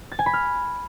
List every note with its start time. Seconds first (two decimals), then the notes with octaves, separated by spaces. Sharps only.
0.12 A6
0.19 G#5
0.26 B5
0.33 F6